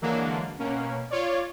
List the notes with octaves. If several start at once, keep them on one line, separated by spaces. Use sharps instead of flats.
D3 E3 F#3 G#3 A#3 D4
B2 A#3 C#4
F4 C#5 D5